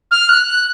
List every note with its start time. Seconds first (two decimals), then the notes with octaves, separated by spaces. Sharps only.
0.11 F6
0.29 F#6
0.47 F#6